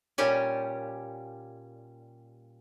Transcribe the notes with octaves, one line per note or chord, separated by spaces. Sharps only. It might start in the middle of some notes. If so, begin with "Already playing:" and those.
A#2 G3 C#4 G4 G#5